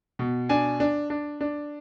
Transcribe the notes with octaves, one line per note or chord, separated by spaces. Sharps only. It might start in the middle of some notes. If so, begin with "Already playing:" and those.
B2
D4 G#5
D4
D4
D4